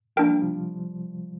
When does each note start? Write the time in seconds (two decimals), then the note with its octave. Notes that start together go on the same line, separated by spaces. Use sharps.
0.16 F3 A#3 D4 A#4 G5
0.29 G3
0.42 C3 F3